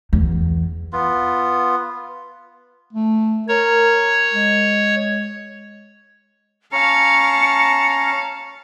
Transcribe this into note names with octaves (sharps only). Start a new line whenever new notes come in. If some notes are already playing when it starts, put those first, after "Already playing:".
E2
B3 F4
A3
A#4 C#5
G#3
C#4 F5 A5 A#5 C#7